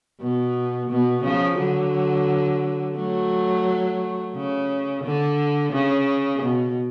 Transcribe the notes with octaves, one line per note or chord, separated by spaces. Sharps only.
B2
B2
C#3 F3
D3 F#3
F#3 A3
C#3
D3
C#3
B2